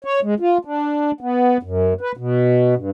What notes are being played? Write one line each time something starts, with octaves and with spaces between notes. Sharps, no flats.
C#5
G#3
F4
D4
B3
F#2
B4
B2
G2